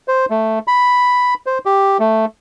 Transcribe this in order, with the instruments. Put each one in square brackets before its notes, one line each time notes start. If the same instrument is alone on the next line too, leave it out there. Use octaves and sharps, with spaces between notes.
[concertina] C5
A3
B5
C5
G4
A3